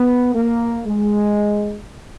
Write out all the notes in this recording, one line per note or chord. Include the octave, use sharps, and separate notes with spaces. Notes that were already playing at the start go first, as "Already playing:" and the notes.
Already playing: B3
A#3
G#3